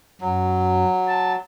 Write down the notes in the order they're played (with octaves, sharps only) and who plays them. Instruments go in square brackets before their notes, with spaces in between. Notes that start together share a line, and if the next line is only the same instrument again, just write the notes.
[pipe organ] F#2 [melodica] F#3
[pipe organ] A5